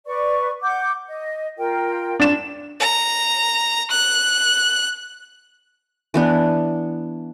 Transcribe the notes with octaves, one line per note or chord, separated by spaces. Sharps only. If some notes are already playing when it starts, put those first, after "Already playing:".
B4 D5 C#6
F#5 D6 G6
D#5
F4 A#4 G5
D4 E7
A#5
F#6
E3 B3 D4